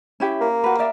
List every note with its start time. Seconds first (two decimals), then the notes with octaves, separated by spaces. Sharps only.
0.20 C#4 E4 G4
0.41 A#3
0.64 F#4 B4
0.79 A#4 D5 E5